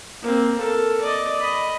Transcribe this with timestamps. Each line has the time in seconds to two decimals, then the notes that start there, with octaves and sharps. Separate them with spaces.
0.23 A#3 C4
0.58 A4 A#4
1.01 D5 D#5
1.38 D#5 B5